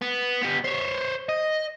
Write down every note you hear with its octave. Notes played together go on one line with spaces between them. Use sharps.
B3
B3 G4
C5 C#5
D#5